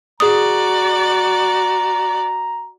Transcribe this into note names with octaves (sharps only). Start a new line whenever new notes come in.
F#4 G#4 D5 A#5 D#6